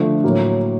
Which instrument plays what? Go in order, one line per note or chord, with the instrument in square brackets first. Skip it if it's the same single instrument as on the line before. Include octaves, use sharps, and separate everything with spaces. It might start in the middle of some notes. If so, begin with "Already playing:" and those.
Already playing: [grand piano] D3 F3 A3
A2 F#3 A#3